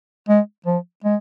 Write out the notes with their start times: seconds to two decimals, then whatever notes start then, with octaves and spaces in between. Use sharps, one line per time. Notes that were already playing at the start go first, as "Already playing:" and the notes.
0.29 G#3
0.66 F3
1.05 G#3